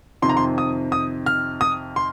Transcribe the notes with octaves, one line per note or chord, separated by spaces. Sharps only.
F2 C3 D#3 C6
A#5
C6
D#6
D#6
F6
D#6
C6